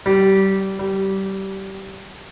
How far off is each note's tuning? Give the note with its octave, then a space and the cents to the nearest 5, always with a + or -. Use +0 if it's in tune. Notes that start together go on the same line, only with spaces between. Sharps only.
G3 -25
G3 -25